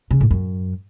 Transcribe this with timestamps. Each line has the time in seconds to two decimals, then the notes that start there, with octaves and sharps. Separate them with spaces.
0.11 C#3
0.21 A2
0.31 F#2